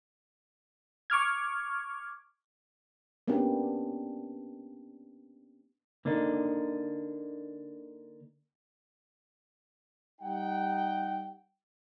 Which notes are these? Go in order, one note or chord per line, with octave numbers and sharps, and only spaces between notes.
C#6 D6 F6 G#6
A#3 B3 C#4 D4 G4
D3 A#3 D4 D#4
G3 D#4 F#5 G5